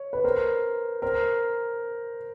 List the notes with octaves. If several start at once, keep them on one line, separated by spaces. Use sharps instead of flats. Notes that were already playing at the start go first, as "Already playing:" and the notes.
Already playing: C#5
B4
A#4 C5
A#4 C5